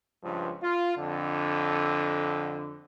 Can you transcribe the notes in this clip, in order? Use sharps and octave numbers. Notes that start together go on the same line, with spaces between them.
C#2 G2 F3
F4
F2 D3